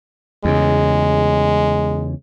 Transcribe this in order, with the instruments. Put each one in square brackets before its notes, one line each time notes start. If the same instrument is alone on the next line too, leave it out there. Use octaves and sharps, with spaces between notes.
[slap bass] E2 C#3 [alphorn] G#3